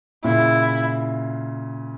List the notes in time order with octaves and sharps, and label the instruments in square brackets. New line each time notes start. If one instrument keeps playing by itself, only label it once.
[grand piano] A#2 C#3 [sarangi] E4